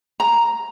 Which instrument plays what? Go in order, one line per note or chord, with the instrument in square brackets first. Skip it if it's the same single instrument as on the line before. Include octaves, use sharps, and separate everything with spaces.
[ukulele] A#5